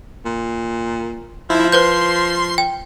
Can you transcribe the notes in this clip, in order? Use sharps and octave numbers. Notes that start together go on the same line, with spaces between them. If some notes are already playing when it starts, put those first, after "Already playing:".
A#2
F3 E4
B4 C5 C6 G6 C7
G5